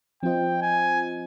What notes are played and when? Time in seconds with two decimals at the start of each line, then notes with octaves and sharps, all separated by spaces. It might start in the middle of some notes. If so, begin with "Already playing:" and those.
0.23 F3 C4 F4 C5 D#5 G5
0.62 G#5